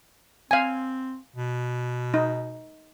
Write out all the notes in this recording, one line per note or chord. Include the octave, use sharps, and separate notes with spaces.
C4 F5 G#5
B2
D#4